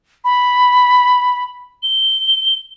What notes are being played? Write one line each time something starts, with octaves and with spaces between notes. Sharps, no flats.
B5
G7